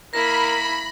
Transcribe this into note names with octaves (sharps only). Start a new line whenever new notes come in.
A#3 E4 A#4 B5 A#6